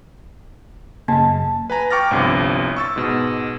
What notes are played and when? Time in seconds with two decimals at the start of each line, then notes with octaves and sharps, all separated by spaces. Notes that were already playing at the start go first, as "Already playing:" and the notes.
1.08 F#2 C#3 A#3 A5
1.70 B4 G#5 A#5
1.90 G5 C#6 D6 F6 A6 A#6
2.11 G1 C2 G2 F3
2.76 C#6 E6 A6
2.96 G#2 B2